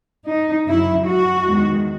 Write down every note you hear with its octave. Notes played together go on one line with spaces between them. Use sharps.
D#4
F#2 C#3 F#3 E4
F#4
E2 D#3 G#3